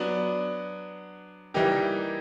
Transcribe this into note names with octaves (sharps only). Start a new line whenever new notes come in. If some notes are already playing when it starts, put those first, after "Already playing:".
Already playing: F#3 B3 D4
E3 G3 A#3 D#4 G4